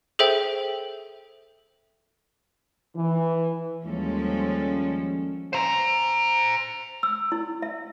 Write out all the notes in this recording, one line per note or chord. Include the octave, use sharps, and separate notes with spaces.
G#4 A4 C5 E5 G5
E3
D#2 F3 G3 G#3 C#4 A4
C5 A#5
E6
E4
E5